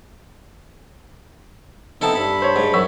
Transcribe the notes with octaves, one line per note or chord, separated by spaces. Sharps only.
B3 C4 D#4 E4 A4 A5
G2 B5
C5 C#5
G#2
F#2 C#6 E6 B6